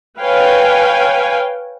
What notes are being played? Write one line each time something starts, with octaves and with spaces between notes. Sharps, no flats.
B4 C#5 F5 G5 G#5